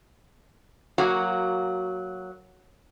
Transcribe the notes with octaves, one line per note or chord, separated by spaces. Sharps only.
F#3 A#3 F#4 F5